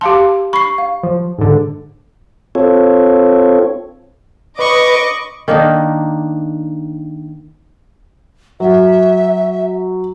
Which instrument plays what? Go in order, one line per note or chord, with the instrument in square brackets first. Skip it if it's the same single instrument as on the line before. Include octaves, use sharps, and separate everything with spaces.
[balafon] G4 F5 A5 [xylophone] C6
[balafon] B5 [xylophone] C#6 C7
[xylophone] F5
[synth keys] F3
G#2 D3
[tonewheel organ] C4 F4 A4 C#5
[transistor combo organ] B4 [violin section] D#5 D6 [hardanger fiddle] B5 C#6
[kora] D#3 A#3 D4 D#4
[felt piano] F#3 [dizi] E5